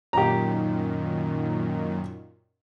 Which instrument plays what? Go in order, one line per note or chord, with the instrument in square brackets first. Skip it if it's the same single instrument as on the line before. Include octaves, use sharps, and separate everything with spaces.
[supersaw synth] F#2 A#2 D#3 [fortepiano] G4 A#5